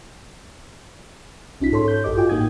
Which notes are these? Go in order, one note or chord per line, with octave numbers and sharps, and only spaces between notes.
C2 C#4 D#4 F4 B6
G#2 A4 C#5 C6
G6
A1 G2 G4 A4 D#5 D6
F4 F#4 G5 G#5 D6
A2 A#3 D#4 G5 D#6 G#6